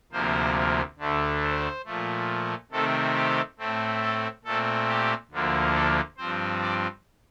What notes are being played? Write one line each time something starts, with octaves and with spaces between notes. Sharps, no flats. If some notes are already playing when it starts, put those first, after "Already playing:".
D2 C3 F3 A#3 C5
D2 D3 A3
C5
A#2 F3 A3
C3 D#3 A3 C4 A4
G4
A2 A3 C4
A4
A#2 A3 C4 A4
G4
D2 D3 F3 A#3
A4
G2 F3 C4 C5
D5